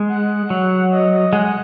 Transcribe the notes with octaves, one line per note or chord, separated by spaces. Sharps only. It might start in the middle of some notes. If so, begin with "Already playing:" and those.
Already playing: G#3
F#5
F#3
D#5
D#5
G#3 F#5